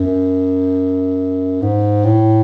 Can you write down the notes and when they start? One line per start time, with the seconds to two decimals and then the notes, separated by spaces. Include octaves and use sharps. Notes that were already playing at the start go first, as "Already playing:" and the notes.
Already playing: F#2
1.62 G#2
2.04 A2